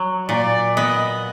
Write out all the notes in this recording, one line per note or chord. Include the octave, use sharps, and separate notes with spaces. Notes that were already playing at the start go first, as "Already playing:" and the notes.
Already playing: F#3
A#2 D5
B3 D#5